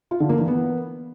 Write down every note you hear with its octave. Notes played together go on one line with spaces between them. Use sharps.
F4
D3
A#3
E3
B3